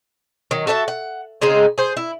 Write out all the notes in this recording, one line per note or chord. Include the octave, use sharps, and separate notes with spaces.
D#3 F#3
F#4 A4 E5 A5
F#5
C#3 G#3 C4 D#4
G#4 C5
E4